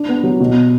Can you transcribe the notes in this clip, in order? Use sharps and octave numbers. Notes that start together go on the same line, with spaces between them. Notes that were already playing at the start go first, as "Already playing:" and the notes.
Already playing: D4
B3
F#3
B2